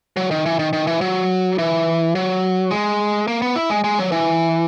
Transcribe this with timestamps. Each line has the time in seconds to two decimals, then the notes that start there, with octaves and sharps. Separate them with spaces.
0.17 F#3
0.31 D#3
0.46 E3
0.59 D#3
0.73 D#3
0.87 E3
1.01 F#3
1.58 E3
2.15 F#3
2.71 G#3
3.28 A#3
3.42 B3
3.56 E4
3.70 G#3
3.84 G#3
3.99 F#3
4.12 E3